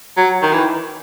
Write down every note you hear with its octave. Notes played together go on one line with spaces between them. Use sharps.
F#3
D#3
E3